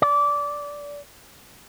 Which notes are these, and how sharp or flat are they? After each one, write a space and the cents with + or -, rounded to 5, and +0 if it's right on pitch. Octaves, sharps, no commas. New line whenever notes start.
D5 -20